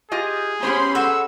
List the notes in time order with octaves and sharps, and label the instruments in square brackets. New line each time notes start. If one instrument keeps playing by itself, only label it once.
[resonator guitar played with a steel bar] F4 G4 D#5 [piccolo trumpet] G#4
[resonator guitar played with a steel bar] B3 G4 C5 [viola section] C#4 B5 C6
[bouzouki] F#4 G#4 A4 [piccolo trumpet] E6